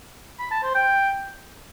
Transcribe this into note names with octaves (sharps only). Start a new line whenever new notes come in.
B5
A5
C5
G5